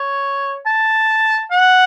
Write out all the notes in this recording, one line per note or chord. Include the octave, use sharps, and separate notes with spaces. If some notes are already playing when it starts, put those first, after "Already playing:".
Already playing: C#5
A5
F#5